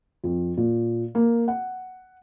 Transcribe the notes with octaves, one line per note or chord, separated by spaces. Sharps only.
F2
A#2
A#3
F#5